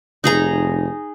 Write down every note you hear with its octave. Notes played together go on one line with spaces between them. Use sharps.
F1 D#4 G#4 A#5